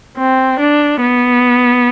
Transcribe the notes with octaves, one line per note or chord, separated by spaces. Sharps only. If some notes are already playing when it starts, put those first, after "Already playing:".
C4
D4
B3